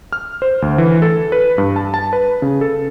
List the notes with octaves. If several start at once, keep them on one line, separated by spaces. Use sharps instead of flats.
F6
C5
D2
E3
A4
B4
G2
A5
A5
B4
C#3
A4